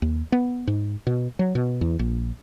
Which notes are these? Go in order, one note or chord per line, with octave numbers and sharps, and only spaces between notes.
D#2
B3
G#2
B2
F#3
B2
E2
A#1